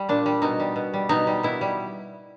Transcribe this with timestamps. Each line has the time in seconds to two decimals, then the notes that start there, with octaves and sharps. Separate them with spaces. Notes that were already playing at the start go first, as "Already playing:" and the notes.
Already playing: G3
0.09 A#2 D4
0.26 G3
0.42 B2 D#4
0.60 G3
0.76 B2
0.94 G3
1.09 B2 D#4
1.27 G3
1.43 B2 E4
1.61 G3